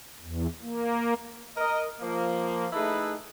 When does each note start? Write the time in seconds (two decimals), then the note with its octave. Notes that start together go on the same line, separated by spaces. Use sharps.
0.22 E2
0.62 A#3
1.57 A#4 D#5
2.01 F3 A#3
2.72 A3 D#4 E4 G#4 A4 B4